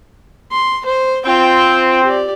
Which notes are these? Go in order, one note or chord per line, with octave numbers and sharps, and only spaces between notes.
C6
C5
C4 F4 G5
G4 D5